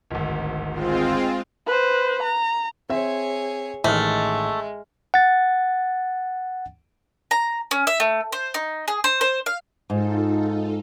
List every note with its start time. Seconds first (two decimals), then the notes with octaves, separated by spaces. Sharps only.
0.11 D1 G#1
0.70 G#3 C4 F4
1.67 B4 C5
2.23 A#5
2.89 C4 G#4 C#5 E5
3.84 A1 D#3 G#3 A3 F6
5.14 F#5 A6
7.31 A#5
7.71 C#4
7.87 E5
8.00 A3
8.32 C5
8.54 D#4
8.88 G#4
9.04 C5
9.21 C5
9.46 F5
9.90 G#2 D#4 F4 A4